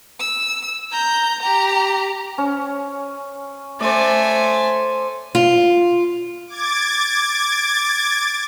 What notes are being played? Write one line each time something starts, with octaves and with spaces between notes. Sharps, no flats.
E6
A#5 G6
G4 A#5
C#4
A3 C5 D5 G#5
F4
D6 G#6 A6